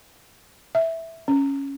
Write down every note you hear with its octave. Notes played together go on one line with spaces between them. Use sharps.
E5
C#4